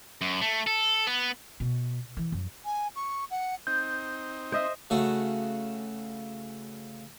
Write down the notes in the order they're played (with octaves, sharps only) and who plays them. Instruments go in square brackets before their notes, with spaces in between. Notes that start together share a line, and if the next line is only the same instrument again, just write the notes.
[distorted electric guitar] F#2
A3
A4
B3
[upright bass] B2
E3
F#2
[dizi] G#5
C#6
F#5
[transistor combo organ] C4 D#4 [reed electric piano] G6
[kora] C5 D#5 E5
[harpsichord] C#3 A3 F#4